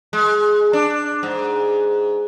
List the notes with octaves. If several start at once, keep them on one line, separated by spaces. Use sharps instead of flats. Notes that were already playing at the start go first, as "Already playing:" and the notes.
G#3
D4
G#2